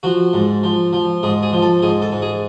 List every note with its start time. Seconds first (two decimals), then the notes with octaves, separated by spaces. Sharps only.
0.03 F3 F#4
0.33 G#2
0.63 F3
0.93 F3
1.23 G#2 G#4
1.42 G#4
1.53 F3
1.62 A4
1.82 G#2 G#4
2.02 A4
2.12 G#2
2.22 G#4